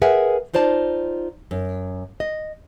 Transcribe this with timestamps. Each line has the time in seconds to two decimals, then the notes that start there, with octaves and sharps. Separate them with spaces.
0.02 G#4 A#4 B4 E5 F#5 G#5
0.53 D#4 F4 C5 D5 A5
1.51 F#2
2.20 D#5